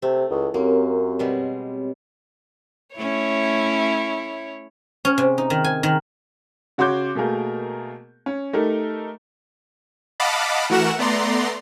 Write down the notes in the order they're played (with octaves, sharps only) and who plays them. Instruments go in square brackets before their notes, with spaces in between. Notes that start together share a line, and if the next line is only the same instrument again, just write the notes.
[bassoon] C3 [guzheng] A3
[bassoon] C#2 [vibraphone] E4
[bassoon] F#2 [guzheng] A#3 [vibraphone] C4 G4 C#5
[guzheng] B2 G3 G#3
[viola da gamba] A3 C#4 [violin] E4 C#5
[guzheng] C#4
C3
D#4
D#3
G#5
D#3
[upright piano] C#3 F#4 C#5 C6 D6 G6
B2 A3 A#3 G#4 A#4
C#4
A3 D#4 G4 A4 A#4
[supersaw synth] D#5 F5 F#5 A5 B5 D6
E3 A3 F#4 A#4 F#5 E7
A3 B3 D5 A#5 C6